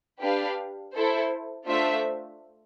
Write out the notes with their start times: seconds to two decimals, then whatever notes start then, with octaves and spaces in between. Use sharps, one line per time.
0.21 D4 G4 B4 F5
0.94 E4 A4 C5
1.67 A3 D4 F4 C5 E5